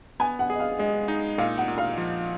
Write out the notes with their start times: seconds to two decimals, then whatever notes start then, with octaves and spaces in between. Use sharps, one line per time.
0.20 B3 G#5
0.39 F#5
0.50 G#4 D#5
0.59 F5
0.79 G#3 D#5
1.08 D#4
1.38 A#2 F5
1.58 F#5
1.68 A#2
1.78 F5
1.98 F3